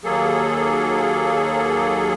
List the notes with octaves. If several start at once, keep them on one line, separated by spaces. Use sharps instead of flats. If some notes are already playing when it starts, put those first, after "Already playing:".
D#2 F#3 A#3 G#4 A4